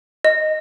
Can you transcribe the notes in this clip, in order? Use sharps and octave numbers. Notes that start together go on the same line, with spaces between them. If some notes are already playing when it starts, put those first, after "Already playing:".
D#5